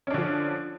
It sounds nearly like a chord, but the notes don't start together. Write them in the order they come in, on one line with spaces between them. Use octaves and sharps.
C#4 D4 D3 F3